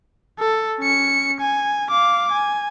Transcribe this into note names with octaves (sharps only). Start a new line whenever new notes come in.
A4
C#4 C#7
G#5
F5 D6
G#5